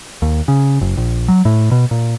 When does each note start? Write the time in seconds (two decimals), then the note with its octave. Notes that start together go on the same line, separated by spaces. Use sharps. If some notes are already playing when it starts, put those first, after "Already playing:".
0.22 D#2
0.48 C#3
0.81 F#1
0.97 A#1
1.28 F#3
1.45 A2
1.71 B2
1.91 A#2